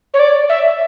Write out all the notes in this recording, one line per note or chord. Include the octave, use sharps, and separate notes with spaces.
C#5
D5
E5